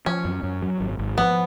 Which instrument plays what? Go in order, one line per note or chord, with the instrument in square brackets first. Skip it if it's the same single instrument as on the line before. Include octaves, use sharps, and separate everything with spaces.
[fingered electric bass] F3 [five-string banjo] C#4
[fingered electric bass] F#2
F#2
F#3
G#1
G#1
[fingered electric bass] F3 [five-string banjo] B3